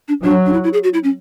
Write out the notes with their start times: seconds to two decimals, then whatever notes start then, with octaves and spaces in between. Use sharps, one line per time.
0.08 D4
0.23 F#3 D4
0.46 D4
0.53 E4
0.64 E4
0.73 G#4
0.84 F#4
0.94 E4
1.04 C#4